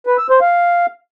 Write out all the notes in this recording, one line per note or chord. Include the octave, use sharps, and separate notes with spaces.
B4
E6
C5
F5